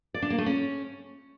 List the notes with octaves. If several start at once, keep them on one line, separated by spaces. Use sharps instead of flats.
D5
D4
A#3
A3
C#4